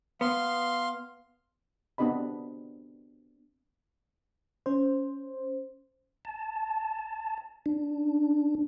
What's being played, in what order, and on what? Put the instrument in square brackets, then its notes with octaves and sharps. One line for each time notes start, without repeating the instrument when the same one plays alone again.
[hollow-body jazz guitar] B3 [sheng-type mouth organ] F5 C6
[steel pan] B3 C4 D4 G4 D#5 B5
[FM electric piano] C#4 C5
[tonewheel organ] A5
D4